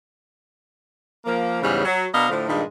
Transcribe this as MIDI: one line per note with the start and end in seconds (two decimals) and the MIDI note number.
1.25 1.58 53
1.25 1.58 58
1.62 1.83 40
1.62 1.83 44
1.62 1.83 49
1.62 1.83 55
1.62 1.83 61
1.84 2.06 54
2.13 2.29 47
2.13 2.29 62
2.13 2.29 70
2.13 2.29 75
2.13 2.29 77
2.29 2.46 45
2.29 2.46 50
2.29 2.46 53
2.47 2.63 43
2.47 2.63 46
2.47 2.63 51
2.47 2.63 56